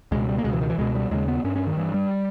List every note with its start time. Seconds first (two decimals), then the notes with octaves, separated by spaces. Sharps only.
0.12 C#2 B2 G#3
0.29 G3
0.38 A#3
0.44 C#2 B2 G#3
0.53 E3
0.61 D#3
0.70 E3
0.78 C#2 B2 G#3
0.95 G3
1.11 D#2 C#3 G#3
1.28 B3
1.44 G2 C#4
1.56 C#4
1.67 D#3
1.77 G2 E3
1.94 G3